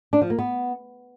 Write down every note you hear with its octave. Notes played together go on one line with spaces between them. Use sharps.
D4
F3
A#3
B3